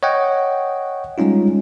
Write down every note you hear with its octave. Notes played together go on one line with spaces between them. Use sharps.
C#5 D#5 F#5 G5
G3 G#3 C#4 D#4 F4